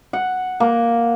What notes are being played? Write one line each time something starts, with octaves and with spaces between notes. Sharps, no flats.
F#5
A#3